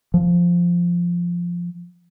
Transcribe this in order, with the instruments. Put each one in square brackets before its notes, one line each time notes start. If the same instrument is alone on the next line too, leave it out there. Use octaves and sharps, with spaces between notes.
[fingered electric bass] F3